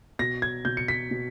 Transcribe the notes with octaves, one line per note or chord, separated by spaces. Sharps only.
B2 A#6
G#6
B2 G6
C#7
B6
B2